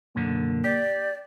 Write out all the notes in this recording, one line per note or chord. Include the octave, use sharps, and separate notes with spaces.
B1 F#2 D3 A#3
G4 D5